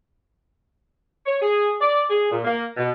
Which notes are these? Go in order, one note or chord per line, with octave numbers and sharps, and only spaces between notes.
C#5
G#4
D5
G#4
A#2
A#3
B2